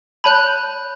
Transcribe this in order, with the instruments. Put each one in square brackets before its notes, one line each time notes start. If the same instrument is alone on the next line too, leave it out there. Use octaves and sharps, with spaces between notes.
[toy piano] C#5 A5 B5 [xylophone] F#6 G6 F#7